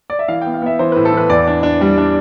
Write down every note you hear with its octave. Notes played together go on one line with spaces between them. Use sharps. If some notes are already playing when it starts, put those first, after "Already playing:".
D5
E5
E3 F5
G5
B3
F5
B3 E5
E3 C5
B4
A2
A4
E3 B4
E2 D5
D4
D4
G3
D4